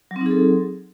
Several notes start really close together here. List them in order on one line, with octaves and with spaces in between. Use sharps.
F#3 C4 D#4 G#4 A4